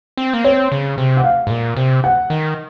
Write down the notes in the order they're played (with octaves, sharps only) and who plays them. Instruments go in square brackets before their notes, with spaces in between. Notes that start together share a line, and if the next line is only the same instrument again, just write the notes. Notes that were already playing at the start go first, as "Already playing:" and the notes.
[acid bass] C4
A#3
[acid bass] C4 [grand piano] C#5
[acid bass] C#3
C3
[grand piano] F#5
F5
[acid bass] G#2
A#2
C3
[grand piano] F#5
[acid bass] D#3